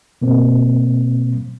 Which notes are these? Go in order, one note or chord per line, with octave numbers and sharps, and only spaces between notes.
B2 A#3 C4